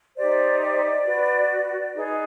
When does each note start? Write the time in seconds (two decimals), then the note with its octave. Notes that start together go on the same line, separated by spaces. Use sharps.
0.16 D#4 G4 C5 D5
0.61 D5
1.05 F#4 B4
1.94 D#4 G#4 B4